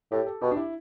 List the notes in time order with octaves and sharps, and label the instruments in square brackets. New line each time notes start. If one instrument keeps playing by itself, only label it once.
[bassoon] A2 [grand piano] G4
[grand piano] A4
[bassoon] B2 [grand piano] G4
[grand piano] D4
E4